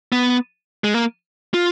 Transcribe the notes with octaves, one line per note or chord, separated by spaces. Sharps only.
B3
G#3
A#3
F4